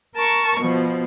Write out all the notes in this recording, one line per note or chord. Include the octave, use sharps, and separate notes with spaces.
A#4 A5 C#6
B2 F3